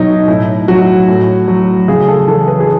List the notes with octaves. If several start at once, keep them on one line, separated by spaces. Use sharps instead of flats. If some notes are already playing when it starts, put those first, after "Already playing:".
Already playing: B2 F#3 D#4 E4
A2 E4
F#3 F#4
A2
F#3
C#3 G#4
A4
E3 A4
B4
G#4